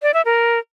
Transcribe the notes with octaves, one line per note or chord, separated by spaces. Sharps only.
D5
E5
A#4